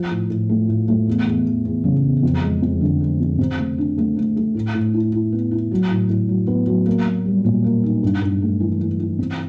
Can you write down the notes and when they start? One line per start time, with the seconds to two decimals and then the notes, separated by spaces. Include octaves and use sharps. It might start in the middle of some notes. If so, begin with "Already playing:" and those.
Already playing: F3
0.11 A2
0.30 A2
0.49 A3
0.68 A2
0.88 A3
1.07 E2
1.27 E2
1.46 E2
1.65 E2
1.84 C#3
2.04 E2
2.22 F2
2.42 G#3
2.62 F2
2.81 D3
3.01 G#3
3.20 F2
3.38 C3
3.58 A3
3.78 D4
3.98 A3
4.17 A3
4.36 A3
4.55 A2
4.75 A2
4.94 E4
5.13 E4
5.32 B3
5.51 E4
5.71 F#3
5.91 A2
6.09 A2
6.29 F#3
6.48 B3
6.67 F#3
6.86 A#3
7.05 A#3
7.26 G3
7.45 A#2
7.64 A#3
7.84 D#4
8.03 G2
8.22 G2
8.42 A3
8.60 E3
8.80 E3
8.99 E3
9.18 C3